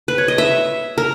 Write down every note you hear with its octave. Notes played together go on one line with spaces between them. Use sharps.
B4
C#5
D#5
E5
A#4